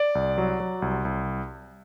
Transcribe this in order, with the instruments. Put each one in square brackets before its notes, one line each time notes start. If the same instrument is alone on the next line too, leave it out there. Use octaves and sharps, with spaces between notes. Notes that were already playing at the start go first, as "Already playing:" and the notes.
Already playing: [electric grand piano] D5
C2
F#3
F#3
C2
C2